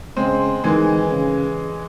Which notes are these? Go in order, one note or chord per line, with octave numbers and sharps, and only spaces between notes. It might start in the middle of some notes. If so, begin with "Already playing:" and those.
C#3 G#3 C4
D#3 E3 G#3
C#3